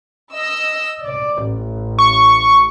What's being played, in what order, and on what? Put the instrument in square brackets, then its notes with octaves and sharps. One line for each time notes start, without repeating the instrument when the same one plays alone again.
[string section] D#5 E6
D5
A1
[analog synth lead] C#6